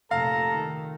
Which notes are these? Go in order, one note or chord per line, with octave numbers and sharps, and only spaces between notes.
F1 A#2 A4 F5 A#5
D#3